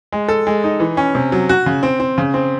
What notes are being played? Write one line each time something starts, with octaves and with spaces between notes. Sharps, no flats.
G#3
A4
G#3
D#4
E3
C#4
C3
F#3
F#4
C#3
C4
C4
C#3
C4